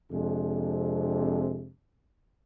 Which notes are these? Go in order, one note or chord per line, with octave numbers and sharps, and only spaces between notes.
F2 C3 G#3 D4